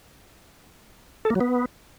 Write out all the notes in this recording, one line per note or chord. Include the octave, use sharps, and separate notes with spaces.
A4
A#3
F#3
B3